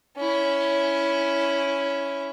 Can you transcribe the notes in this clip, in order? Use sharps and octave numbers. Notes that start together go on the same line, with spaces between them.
C#4 E4